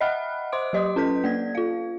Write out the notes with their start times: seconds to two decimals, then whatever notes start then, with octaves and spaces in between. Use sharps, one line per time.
0.01 D#5 E5 F#5 B5 F6 F#6
0.52 C5 C6 D6 D#6 D7
0.73 F#3 G4 D#5 C6 D#6
0.96 C#4 A4 B4 G6 B6
1.24 A#3 D5 G#6
1.55 F4 F5